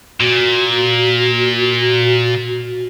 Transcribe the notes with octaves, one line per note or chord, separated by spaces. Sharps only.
A#2 F#4